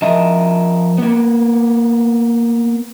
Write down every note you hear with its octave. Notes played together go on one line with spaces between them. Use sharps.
F3 A#4 D#5 E5
A#3 B3